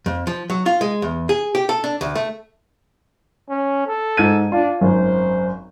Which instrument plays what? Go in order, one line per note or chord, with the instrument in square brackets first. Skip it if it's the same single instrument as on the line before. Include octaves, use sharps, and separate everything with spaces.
[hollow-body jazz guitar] F2
F3
F#3
F4
G#3
E2
G#4
G4
A4
D4
D2
A3
[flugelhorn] C#4
A4
[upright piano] G#2 G#6 D#7
[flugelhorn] D4 [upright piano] F4
[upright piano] G#1 F#2 [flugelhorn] C5